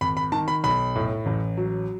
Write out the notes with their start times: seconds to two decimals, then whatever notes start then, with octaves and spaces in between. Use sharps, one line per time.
0.01 G#1 B5
0.17 B5
0.32 D#3 A5
0.48 B5
0.64 B1 B5
0.95 A2
1.26 A1
1.57 F#3